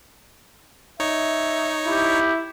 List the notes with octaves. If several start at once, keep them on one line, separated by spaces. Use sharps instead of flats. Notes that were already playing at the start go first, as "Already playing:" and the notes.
D#4 C#5 E5
E4 G4